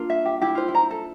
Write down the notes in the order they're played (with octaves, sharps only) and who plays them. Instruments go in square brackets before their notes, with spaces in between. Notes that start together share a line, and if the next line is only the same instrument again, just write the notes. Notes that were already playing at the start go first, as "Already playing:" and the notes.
Already playing: [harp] A#3 D4 F4
[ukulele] E5
G4
[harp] E4 [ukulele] G4
[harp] F4 [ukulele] C5
[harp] E4
[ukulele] A#5
A4